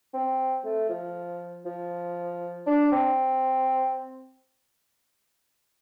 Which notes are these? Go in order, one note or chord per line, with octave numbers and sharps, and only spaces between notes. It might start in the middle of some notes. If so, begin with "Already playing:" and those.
C4
A3
F3
F3
D4
C4